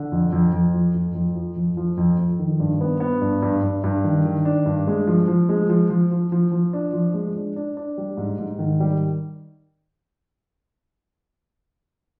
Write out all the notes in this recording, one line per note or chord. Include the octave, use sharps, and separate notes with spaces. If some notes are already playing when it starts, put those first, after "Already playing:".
Already playing: D3
F2
F2
F2
F3
F2
F2
F3
F2
F3
F2
F2
D#3
G2
B3
B3
G2
G2
G2
G2
D#3
D#3
D4
G2
G#3
F3
F3
G#3
F3
F3
F3
F3
F3
D4
F3
G#3
D4
D4
D4
G3
G#2
G#2
D#3
G3